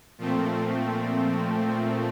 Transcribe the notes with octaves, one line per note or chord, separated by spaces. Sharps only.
A#2 F3 A3 C4